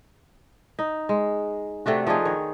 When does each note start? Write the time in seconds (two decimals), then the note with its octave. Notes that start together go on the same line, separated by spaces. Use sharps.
0.79 D#4
1.09 G#3
1.86 C3 A3 D4 F#4
2.07 F3 D4 D#4 G#4
2.25 D#3 C#5